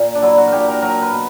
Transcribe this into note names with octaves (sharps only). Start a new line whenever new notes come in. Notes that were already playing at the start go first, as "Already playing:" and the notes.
Already playing: A#2
D4
F#3 E4
F#4
A#2 G4 A#4
A#4
F#3 A#4
B4
B2